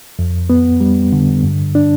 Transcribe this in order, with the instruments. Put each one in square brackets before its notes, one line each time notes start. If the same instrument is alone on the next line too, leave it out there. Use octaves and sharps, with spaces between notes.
[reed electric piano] F2
B3
G3
D3
G2
D4